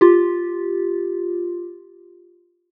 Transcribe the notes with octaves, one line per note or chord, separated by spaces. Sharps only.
F4 G4